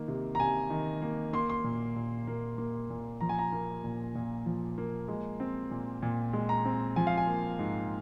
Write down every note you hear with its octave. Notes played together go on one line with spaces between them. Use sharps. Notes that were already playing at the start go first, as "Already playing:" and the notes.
Already playing: D#3 A#3
C3
A#5
C3 G#5
D#3
A#3
A#3 C6
C6
A#2
A#2
A#3
A#3
A#2
F3 A#5
G#5
A#5
A#3
A#2
A#2
F3
A#3
G#3
C4
A#2
A#2
G#3
A#5
C4
F3 G#5
F5
G#5
A#3
G#2